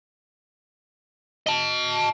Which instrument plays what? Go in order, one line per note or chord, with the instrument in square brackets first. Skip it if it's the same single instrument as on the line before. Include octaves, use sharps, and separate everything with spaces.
[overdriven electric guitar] D#5 A5